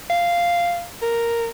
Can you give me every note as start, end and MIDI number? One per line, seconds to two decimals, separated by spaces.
0.10 0.85 77
1.02 1.48 70